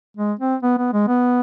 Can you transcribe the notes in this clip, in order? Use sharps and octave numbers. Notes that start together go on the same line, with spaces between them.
G#3
C4
B3
B3
G#3
B3